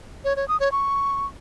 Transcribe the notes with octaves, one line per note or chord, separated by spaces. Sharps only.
C#5
C#5
D#6
C#5
C#6